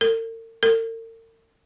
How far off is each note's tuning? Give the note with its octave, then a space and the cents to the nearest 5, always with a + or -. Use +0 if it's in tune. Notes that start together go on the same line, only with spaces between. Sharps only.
A#4 -45
A#4 -45